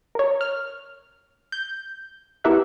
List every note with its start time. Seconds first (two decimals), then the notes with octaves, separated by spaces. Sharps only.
0.15 A#4 C#5
0.41 F6
1.52 G6
2.44 B3 E4 G4 A#4 E5 F#5